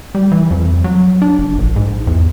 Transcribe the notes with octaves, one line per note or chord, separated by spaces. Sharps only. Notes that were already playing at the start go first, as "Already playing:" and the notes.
G3
E3
F2
F#3
D4
F#1
A#1
G#2
E2